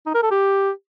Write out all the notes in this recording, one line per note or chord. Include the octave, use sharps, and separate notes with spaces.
D#4
A#4
A4
G4